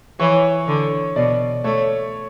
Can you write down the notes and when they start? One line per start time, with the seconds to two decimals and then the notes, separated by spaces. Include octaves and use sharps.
0.19 E3 C#5
0.67 D3
1.16 B2 D5
1.64 A3 C#5